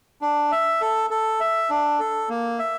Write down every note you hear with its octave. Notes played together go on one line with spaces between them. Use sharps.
D4
E5
A4
A4
E5
D4
A4
A#3
E5